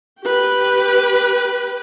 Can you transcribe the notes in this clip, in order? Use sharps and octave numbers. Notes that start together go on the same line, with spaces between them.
G4 B4